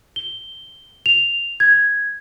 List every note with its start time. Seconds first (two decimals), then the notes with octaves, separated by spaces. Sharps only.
0.16 G7
1.06 F7
1.60 G#6